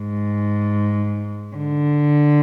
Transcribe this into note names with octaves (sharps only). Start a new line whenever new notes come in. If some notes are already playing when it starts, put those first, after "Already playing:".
Already playing: G#2
D3